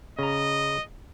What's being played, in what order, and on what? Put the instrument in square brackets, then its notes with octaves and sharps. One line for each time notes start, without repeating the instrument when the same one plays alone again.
[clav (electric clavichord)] C#3 A#5 [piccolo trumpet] D#5